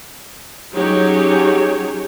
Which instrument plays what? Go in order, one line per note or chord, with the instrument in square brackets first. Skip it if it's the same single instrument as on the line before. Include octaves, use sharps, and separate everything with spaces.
[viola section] F#3 C#4 D#4 G4 G#4 C#5